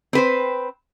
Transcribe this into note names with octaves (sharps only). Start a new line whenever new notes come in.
C4 B4 C5